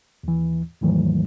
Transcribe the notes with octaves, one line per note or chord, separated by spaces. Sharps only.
D#2 E3
D#2 G#2 D#3 E3 F#3 A3